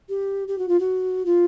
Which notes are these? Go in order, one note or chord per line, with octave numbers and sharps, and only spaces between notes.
G4
G4
F#4
F4
F#4
F4